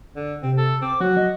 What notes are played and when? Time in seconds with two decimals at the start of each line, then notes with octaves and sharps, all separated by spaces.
0.16 D3
0.43 C3 C4
0.57 A4
0.82 C4 D6
1.01 F#3 F#4
1.17 D#5